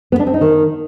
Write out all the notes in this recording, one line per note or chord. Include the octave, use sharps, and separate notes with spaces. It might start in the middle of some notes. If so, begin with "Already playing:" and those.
B3
D4
C4
D#4
D#3